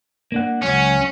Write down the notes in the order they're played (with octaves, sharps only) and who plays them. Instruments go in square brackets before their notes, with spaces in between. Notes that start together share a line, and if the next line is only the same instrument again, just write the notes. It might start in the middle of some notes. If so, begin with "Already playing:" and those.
[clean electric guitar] A#3 D4 F#5
[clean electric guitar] C#2 F#3 F#5 [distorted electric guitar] C#4